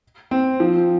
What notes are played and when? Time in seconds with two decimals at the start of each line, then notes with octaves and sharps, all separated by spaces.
0.31 C4
0.60 F3